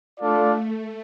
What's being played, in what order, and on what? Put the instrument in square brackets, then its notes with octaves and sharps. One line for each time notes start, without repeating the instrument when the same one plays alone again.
[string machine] A3 [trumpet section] D4 F4 A4 D5 F5